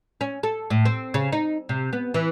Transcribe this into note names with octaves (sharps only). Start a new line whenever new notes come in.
C#4
A4
A2
C4
C#3
D#4
C3
B3
E3